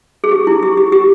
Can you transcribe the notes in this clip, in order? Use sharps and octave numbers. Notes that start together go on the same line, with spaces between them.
G#4
G4
E4
G4
G4
G4